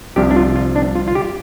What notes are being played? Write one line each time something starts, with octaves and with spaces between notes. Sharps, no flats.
C2 C3 F3 D4 G4
D4
F4
F4
D4
F4
F4
G4